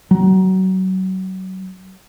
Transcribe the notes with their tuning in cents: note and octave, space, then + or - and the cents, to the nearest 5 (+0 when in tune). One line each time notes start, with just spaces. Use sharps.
F#3 +25